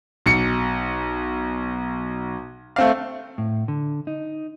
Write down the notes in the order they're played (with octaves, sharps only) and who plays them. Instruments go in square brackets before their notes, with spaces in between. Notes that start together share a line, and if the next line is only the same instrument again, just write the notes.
[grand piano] B1 C#7
A3 C4 F5
[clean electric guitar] A2
D3
D#4